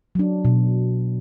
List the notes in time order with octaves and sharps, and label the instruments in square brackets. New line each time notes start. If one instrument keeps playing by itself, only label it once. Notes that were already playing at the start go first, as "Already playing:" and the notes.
[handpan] F#3 D4
B2